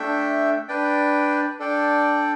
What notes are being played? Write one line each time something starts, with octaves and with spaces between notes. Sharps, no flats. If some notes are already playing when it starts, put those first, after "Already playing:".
Already playing: A3 D4 A4 E5 G5
D4 B4 D5 G5
D4 A4 D5 G5